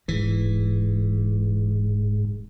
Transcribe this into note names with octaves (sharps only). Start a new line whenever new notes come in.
D#1 A#1 G#2 E3